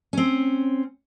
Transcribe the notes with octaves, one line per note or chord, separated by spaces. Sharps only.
C4 C#4